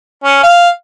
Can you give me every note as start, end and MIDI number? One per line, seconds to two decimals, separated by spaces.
0.24 0.39 61
0.43 0.69 77